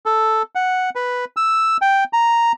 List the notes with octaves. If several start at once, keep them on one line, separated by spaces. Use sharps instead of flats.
A4
F#5
B4
E6
G5
A#5